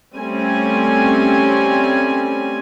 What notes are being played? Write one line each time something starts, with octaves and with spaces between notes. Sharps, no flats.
G3 A3 C4 C#4 G#5